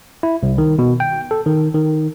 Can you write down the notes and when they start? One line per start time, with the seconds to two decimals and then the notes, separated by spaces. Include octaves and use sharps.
0.23 E4
0.43 C2
0.58 D#3
0.79 B2
1.00 G5
1.31 A4
1.46 D#3
1.75 D#3